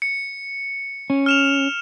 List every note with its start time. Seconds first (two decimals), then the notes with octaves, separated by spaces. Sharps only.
0.02 C#7
1.10 C#4
1.26 F6 E7 F7